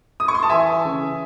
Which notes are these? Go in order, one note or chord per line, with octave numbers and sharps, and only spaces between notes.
D#6
C#6
C6
A5
E3 E5 G#5
C#3